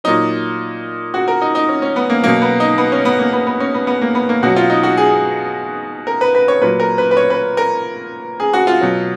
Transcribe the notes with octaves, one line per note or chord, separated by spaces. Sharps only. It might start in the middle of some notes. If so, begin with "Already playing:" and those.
A#2 F#3 D#4
F#4
A#4
D#4
D#4
C#4
C#4
B3
A#3
B2 F#3 A#3
B3
D#4
B3
C#4
B3
A#3
B3
B3
C#4
B3
B3
A#3
B3
A#3
B2 F#3 F#4
F4
D#4
F#4
G#4
A#4
B4
B4
C#5
A#2 F#3 B4
A#4
B4
B4
C#5
B4
A#4
G#4
F#4
F4
B2 F#3